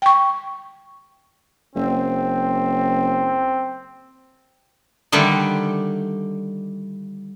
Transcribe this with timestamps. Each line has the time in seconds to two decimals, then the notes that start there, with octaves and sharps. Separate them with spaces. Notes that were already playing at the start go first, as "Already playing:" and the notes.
0.02 G5 C#6
1.75 F#1 C4
5.12 D3 D#3 G3 A3 D4